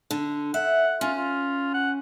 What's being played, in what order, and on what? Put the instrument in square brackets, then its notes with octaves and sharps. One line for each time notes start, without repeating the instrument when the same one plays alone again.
[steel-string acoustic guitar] D3
[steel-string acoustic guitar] E5 [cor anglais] F#5
[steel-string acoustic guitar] C#4 [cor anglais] F4
[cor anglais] F4
F#5